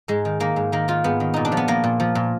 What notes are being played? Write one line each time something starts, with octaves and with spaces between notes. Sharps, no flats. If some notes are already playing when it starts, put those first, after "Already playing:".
G#2 G#3
D#3
D#3 A#3
G#2
D#3 A#3
D#3 F4
G#2 B3
D#3
A#2 D#4
D4
F3
B3
F3 A#3
A#2
F3
A#2